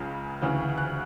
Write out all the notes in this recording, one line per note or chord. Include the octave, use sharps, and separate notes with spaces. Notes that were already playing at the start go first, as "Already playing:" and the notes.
Already playing: C#2 C#3 G#3
D2 C#3 E3
F#6